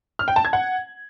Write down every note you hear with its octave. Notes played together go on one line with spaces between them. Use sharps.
F6
G5
A5
G#6
F#5